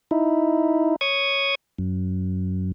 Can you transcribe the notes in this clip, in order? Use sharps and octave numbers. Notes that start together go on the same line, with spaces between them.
D#4 E4
C#5 C#6 D#6 G#6
F#2